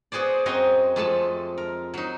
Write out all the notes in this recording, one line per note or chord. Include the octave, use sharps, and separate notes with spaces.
B3 F#4 G#4 C5 D5
F#2 C4 F#4 D#5 A#5 C6
F2 G#3 A3 A5
A#4
F#3 D#4